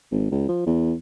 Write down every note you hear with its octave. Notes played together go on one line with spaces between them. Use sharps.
G#1
C#2
F3
E2